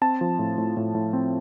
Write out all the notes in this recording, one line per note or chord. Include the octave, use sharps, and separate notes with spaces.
C4 A5
F3
A2
A2
A2
A2
C4